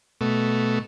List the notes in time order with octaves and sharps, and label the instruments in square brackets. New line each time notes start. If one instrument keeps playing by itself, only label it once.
[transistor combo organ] B2 A3